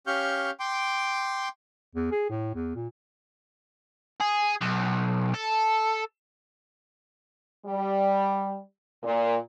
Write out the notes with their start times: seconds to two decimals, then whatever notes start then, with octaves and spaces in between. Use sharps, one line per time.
0.07 C#4 G4 F5 C#6 F6 G6
0.60 G5 C6 D6
1.95 E2
2.11 G#4
2.30 A2
2.55 E2
2.75 A#2
4.20 G#4
4.61 B1
5.34 A4
7.66 G3
9.03 A#2